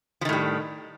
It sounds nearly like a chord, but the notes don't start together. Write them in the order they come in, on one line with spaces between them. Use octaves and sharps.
F3 D#3 A2 G3